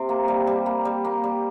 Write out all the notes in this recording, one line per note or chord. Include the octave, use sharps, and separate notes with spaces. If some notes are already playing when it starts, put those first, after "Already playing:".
Already playing: C3
A#3
G3
G3
A#3
G3
A#3
G3